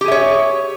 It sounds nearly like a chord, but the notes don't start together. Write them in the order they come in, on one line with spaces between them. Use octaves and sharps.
G4 G#4 E5 C#5